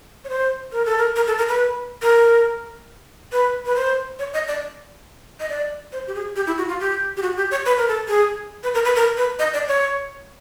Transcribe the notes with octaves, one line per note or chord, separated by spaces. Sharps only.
C#5
C5
A#4
A4
A#4
A#4
A4
A#4
B4
A#4
B4
B4
C5
C#5
D#5
D5
D#5
D5
C5
G4
G#4
G4
E4
F#4
F4
G4
G4
F#4
G4
C#5
B4
A#4
A4
G#4
B4
A#4
B4
A#4
B4
D#5
D5
C#5